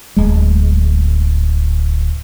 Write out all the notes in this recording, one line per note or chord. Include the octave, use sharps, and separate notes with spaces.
D1 G#3